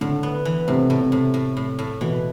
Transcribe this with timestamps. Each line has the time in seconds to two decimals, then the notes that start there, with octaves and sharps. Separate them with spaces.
0.01 A2 D3
0.23 B3
0.45 E3
0.67 A2 C3
0.90 A2
1.01 C3
1.12 A2
1.34 A2
1.57 A2
1.79 A2
2.01 B2 E3